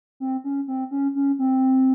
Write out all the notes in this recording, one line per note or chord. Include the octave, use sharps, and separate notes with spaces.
C4
C#4
C4
C#4
C#4
C4